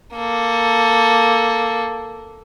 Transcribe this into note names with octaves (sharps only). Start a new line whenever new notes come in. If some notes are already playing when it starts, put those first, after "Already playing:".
A#3 A4